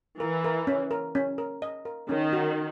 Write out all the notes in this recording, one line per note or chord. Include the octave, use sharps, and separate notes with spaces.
E3 A#4
A#4
C#4
A#4
C#4
A#4
D#5
A#4
D#3 C#4
F#4